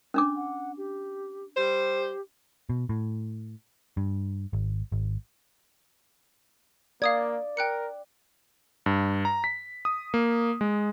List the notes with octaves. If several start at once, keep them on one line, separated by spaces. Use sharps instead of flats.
C#4 D4 D6
F#5
G4
G3 G4 C5
B2
A2
G2
G#1
G#1
A#3 D5 F5 D#6 G#6
A#4 G5 F#6 C#7
G2
A#5
B6
D#6
A#3
G#3